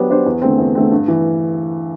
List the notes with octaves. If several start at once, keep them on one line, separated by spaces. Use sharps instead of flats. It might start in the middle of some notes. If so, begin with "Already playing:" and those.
Already playing: F#3 B3 D4 G4 C5
B3 D4 G4 C5
E2
D3 A3 C4
E2
D3 A3 C4
G2
E3